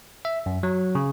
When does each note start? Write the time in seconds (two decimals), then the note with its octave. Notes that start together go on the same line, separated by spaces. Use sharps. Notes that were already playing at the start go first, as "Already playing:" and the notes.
0.25 E5
0.46 F#2
0.63 F#3
0.95 C#3